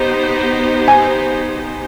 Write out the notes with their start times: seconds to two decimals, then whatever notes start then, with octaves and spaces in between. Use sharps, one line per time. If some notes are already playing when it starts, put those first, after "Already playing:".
Already playing: B3 D#4 G4 C5
0.88 G#5